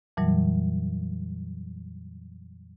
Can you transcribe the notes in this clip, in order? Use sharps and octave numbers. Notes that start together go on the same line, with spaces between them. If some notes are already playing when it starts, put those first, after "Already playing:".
F2 A#2 E3 F#3 G3